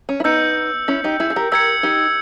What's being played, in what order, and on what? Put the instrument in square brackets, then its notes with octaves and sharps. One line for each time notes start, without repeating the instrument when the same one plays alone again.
[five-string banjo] C#4
E4
[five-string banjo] B3 D#4 [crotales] E6 G6 C#7
[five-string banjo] C#4 E4
D#4 G4
E4 G#4
G#4
G4 A#4
[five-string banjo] G4 A#4 [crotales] E6 G#6 C#7
[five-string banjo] D#4 G4